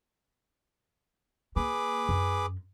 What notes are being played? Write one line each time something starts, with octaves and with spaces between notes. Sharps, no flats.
A#3 G#4 B4 D6
F#2